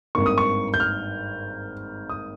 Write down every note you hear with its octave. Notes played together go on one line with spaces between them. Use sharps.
G#1 G2 D#3 A#3 C#6
D#6
C#6
G6
F6
D#6